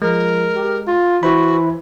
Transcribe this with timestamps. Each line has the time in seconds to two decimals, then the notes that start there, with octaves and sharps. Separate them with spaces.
0.02 F3 G#3 A#4
0.55 G4
0.87 F4
1.23 E3 F#4 C5 B5